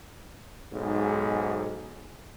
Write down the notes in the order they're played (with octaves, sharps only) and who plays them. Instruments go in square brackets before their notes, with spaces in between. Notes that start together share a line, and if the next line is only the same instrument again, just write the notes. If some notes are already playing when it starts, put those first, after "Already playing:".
[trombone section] B1 G#2